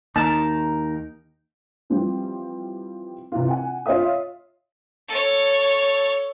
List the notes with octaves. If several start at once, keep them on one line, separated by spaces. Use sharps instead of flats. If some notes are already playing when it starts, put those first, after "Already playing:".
D#2 D#4 A#4 A5
E3 F3 G3 C4
C3 E3 F4
F#5 G#5
F4 C#5 D#5 E5 D#6
A4 C#5